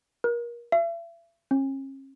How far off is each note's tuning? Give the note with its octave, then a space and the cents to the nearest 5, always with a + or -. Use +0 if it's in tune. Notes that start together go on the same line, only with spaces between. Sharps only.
A#4 +30
E5 +40
C#4 -40